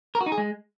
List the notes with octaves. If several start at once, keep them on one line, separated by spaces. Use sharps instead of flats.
A#4
F#4
D#4
G#4
G#3